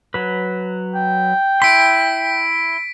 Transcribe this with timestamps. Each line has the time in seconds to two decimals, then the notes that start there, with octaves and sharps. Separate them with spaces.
0.14 F#3 B4
0.95 G5
1.62 E4 C6 B6 D7